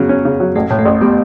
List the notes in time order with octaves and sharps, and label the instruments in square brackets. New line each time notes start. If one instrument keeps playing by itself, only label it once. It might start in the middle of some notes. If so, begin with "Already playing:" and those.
Already playing: [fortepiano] C#3 F#3 [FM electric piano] B3
[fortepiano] C#4
C#3
F#3
[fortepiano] A1 [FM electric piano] A3
[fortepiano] A2
[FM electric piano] A3
[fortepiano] A1
[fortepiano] G3 [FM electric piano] B3